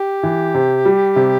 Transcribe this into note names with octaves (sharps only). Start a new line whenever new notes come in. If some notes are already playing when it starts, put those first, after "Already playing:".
Already playing: G4
E3
C3
G3
C3